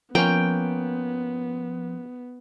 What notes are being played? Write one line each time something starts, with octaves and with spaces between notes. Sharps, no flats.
F3 A#3 B3 C#4 G5